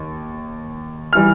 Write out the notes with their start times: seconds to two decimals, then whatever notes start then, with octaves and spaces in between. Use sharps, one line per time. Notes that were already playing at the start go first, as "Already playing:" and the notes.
Already playing: D#2
1.13 E3 G3 F6